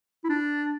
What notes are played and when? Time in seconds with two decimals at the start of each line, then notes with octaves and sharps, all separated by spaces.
0.24 E4
0.29 D4